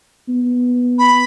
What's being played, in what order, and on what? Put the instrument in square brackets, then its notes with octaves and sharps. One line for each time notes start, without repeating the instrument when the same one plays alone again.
[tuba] B3
[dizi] B5